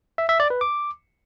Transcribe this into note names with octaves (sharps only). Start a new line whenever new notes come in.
E5
E5
D5
B4
D6